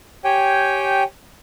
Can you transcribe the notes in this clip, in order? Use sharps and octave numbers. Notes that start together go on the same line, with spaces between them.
G4 C#5 G5 G#5